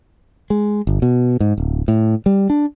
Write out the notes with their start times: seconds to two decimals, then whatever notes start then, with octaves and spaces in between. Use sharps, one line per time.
0.50 G#3
0.87 G1
1.02 B2
1.40 G#2
1.58 D1
1.88 A2
2.26 G3
2.50 D4